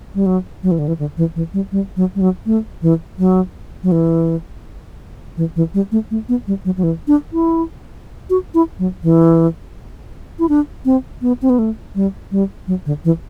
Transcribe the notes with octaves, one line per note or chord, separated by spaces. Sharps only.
G3
F#3
F#3
E3
D3
E3
D3
E3
E3
G3
G3
F#3
G3
F#3
A3
E3
F#3
F#3
E3
E3
E3
G3
A3
A3
B3
G3
F#3
F#3
E3
D4
E4
F#4
E4
F#3
E3
E4
D4
C4
B3
C4
B3
A3
G3
G3
F#3
D3
E3